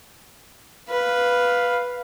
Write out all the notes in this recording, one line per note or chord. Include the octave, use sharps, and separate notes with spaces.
B4 F5